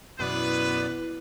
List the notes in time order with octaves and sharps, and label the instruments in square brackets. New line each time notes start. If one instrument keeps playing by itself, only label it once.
[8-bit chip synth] F#2 B3 D5 [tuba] B2 [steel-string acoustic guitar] E3 [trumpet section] G#3 B4